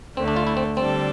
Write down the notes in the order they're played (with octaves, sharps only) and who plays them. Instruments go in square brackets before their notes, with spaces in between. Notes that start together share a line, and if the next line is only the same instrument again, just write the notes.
[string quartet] D2 D3 A3 [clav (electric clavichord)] C4
[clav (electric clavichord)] D4
F4
E4
C4
[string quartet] D3 G3 D4 A4 [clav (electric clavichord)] C4